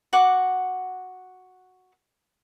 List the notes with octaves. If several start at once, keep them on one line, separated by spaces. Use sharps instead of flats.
F#4 F#5 D6